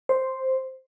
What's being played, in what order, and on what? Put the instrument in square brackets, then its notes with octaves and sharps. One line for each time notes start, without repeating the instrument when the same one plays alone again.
[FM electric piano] C5